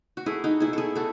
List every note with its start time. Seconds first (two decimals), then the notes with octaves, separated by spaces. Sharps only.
0.17 F#4
0.26 A3 E4 G#4
0.44 D#4 F#4
0.60 B2 E4 G#4
0.73 E4 G#4 A4
0.95 A3 F#4 A4